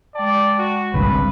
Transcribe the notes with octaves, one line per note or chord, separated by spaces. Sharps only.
G#3 D5 G5 A5
F#4
G#1 C#2 G2 C4 B4